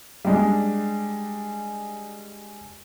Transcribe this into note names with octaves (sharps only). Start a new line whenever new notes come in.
G3 G#3 D4